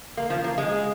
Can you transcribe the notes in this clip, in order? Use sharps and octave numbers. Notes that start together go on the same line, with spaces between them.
A#3
F3
A#3
G#3